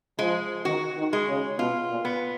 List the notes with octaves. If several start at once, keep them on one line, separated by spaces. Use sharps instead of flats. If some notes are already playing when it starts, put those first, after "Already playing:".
F3 G#3
D#3 F#4
D#3
G#3
C#3
B2 F4
A#2
B3